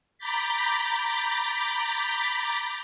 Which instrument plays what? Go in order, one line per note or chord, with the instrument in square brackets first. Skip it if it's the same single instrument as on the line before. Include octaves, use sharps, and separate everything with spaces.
[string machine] A#5 B5 D6 G6 A6 B6